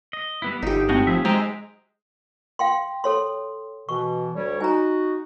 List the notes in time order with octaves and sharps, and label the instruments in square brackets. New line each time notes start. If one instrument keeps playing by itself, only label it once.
[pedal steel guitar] D#5
G3 B3 E4
[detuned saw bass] G1 [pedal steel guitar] D3 [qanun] D#4 G4
[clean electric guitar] A2 C4 [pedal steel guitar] G#3 A3 F#4 [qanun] D#5
[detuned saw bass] F3 [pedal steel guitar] F#3 G#4 E5
[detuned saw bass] G#3 [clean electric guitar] C5 G5 A#5 [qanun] D#5
[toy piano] F5 G5 C6
A4 C#5 C6
[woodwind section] B2 E3 [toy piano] C#6
[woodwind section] D2 G3 C#5
[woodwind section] D#4 F#4 [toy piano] G#5 A#5